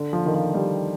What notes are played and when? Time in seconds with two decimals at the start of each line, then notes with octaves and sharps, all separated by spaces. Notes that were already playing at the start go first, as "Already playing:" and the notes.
Already playing: D3
0.13 F3
0.26 D#3
0.34 F3
0.54 G3